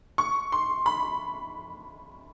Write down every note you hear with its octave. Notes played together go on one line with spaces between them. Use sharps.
C#6
C6
B5